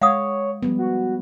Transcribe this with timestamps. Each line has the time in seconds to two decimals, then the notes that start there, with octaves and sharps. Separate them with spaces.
0.02 G#3 C#5 F5 F#5 D#6
0.63 F3 G3 B3
0.79 F#4